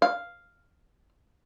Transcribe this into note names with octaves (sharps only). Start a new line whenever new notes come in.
F5